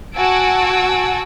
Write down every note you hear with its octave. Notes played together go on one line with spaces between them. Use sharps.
F#4 F#5 G#5 A5 E6 D7